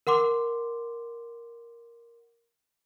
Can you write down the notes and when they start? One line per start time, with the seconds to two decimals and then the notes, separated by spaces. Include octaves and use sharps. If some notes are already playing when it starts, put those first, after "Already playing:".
0.07 A#4 F#5 C6 D6